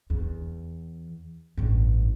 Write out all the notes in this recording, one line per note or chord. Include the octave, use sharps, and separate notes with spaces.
E2
A1 G2